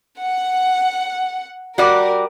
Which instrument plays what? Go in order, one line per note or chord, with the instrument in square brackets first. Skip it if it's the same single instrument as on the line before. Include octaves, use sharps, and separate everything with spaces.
[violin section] F#5
[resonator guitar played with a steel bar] G3 F#4 D5 [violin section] A#4